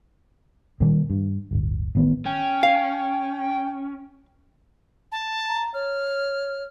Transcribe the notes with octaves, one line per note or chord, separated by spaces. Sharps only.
A#2 D#3 G3 A#3
G2
D1 G1
A1 D#3 B3
C#4 G5
F5
A5
A#5
C#5 F6